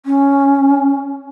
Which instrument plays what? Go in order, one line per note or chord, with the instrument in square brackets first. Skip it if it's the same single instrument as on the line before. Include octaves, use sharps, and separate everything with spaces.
[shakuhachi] C#4